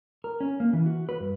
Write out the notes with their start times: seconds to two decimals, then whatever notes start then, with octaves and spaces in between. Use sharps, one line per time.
0.24 A#4
0.40 C#4
0.60 A#3
0.73 E3
0.86 F#4
1.09 B4
1.20 G2